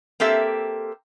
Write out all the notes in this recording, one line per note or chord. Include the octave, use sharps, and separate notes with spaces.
A#3 C4 G4 A4 E5